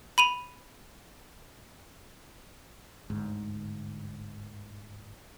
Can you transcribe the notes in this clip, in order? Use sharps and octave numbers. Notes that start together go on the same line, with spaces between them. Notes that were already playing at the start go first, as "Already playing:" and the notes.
B5 D#7 F7
G1 D2 G#2